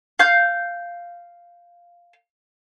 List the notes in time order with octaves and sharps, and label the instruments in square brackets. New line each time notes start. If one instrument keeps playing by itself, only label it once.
[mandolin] F5 G6